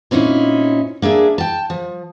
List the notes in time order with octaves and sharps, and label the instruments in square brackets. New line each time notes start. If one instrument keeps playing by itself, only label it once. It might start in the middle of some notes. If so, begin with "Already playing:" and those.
[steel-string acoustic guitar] A#2 C4 C#4 D#4 E4
A#3 D4 G#4 E5
G5 A5
F3